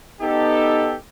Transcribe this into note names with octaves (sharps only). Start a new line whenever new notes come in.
B3 D#4 G4 A4